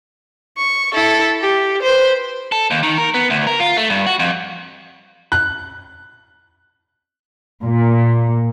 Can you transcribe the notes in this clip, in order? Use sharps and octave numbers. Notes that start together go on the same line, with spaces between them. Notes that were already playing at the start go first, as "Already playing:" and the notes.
C#6
E4 A4
G4
B4 C5
A4
D#2
D#3
A#4
B3
D2
A#4
F4
A3
G2
F#4
F2
F#6
A#2